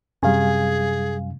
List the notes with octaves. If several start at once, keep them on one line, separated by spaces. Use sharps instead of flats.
F#2 C3 G3 G#4 F5 G#5